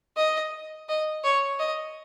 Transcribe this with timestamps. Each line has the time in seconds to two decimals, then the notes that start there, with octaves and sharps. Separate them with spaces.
0.17 D#5
0.89 D#5
1.24 C#5
1.59 D#5